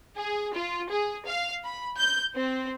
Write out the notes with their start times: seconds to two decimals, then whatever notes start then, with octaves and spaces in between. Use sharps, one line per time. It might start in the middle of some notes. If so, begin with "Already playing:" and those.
0.16 G#4
0.54 F4
0.90 G#4
1.26 F5
1.64 B5
1.98 G6
2.33 C4